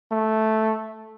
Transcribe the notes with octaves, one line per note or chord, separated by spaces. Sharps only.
A3